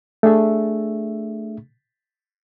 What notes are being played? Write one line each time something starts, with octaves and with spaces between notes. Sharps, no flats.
A3 D4 G#4 E5